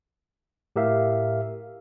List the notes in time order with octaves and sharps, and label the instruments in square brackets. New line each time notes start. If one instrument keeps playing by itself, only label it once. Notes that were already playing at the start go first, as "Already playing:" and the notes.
[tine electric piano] A2 G4 A#4 E5 F5